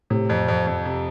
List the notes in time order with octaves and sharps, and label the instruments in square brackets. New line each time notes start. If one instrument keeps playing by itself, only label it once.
[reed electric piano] A2 [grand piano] C3
[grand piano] F2
F2
F2
C3